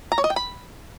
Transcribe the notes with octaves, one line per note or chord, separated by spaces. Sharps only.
A#5
C#5
D#5
G5
B5